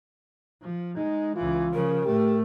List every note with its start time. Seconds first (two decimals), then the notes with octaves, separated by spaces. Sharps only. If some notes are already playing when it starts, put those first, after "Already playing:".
0.62 F3
0.97 G#3 D#4
1.36 C#2 E3 F4
1.74 C#3 F3 A#4
2.05 A2 A3 G4